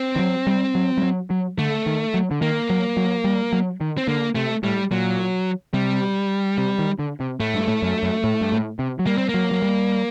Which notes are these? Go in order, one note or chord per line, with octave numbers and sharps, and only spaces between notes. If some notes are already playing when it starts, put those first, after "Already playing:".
Already playing: C4
D#3
F#3
G3
F#3
G3
F#3
F#3
D3 A3
D#3
F#3
D3
D#3 A#3
F#3
F#3
G3
F#3
D#3
C4
D3 A#3
C3 A3
A2 G3
A#2 F#3
C3 G3
C3
D#3
D3
C3
A2 A3
G2
A2
F#2
F#2
A2
G2
A2
C3
F#3
G3 A#3
C4
A#3
F#3
F#3
G3